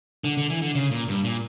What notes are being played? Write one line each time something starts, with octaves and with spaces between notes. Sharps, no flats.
D3
D3
E3
D3
C#3
A#2
G2
A#2